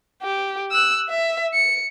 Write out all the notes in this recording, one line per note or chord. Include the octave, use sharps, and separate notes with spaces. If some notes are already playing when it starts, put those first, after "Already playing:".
G4
E6 F#6
E5
C#7